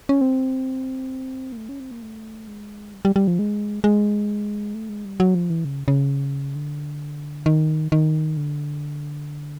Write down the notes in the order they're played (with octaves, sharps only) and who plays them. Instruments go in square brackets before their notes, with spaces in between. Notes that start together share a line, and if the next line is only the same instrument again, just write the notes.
[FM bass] C#4
C4
A#3
A3
C#4
C4
A#3
A3
G#3
G3
G3
G3
F3
G#3
G#3
A3
G#3
G3
F#3
F3
E3
C#3
C#3
D3
D#3
D#3
D3